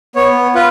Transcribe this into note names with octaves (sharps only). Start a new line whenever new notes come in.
B3 C#5
F4 B4